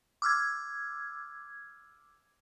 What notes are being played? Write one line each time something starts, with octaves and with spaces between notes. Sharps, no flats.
D6 E6 F6 G#6